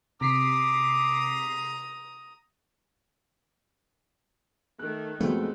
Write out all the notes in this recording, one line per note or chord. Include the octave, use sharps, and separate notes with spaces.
C3 A#5 D6 D#6 B6 C7
D#3 A3 F#6
F2 B2 G#3 A3 B3